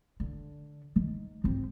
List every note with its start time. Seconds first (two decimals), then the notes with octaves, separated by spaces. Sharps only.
0.20 D3
0.96 D#3
1.44 G#1 C4